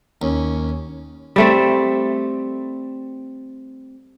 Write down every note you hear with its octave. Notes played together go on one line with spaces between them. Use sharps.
D#2 C#4
G3 A3 C4